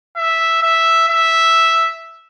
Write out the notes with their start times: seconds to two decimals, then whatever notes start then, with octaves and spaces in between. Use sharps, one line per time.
0.17 E5
0.62 E5
1.08 E5